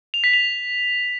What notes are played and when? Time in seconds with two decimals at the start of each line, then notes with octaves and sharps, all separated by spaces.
0.14 F7
0.24 B6
0.33 F7